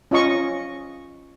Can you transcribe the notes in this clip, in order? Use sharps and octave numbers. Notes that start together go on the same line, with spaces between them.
C#4 F4 D#5 C#6